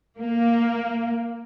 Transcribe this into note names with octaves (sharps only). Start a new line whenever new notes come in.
A#3